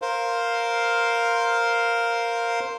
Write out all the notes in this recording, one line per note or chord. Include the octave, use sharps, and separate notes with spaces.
A#4 C5 F5